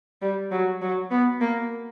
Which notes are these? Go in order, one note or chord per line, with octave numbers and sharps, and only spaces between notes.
G3
F#3
F#3
B3
A#3